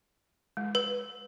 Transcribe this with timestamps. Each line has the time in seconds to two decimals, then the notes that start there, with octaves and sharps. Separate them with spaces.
0.57 G#3
0.75 B4